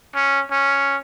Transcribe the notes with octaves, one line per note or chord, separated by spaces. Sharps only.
C#4
C#4